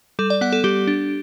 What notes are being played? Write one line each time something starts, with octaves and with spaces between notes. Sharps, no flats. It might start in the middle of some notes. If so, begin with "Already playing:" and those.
G3 A4
D5
B3 F#5
A4
G3 G4
D4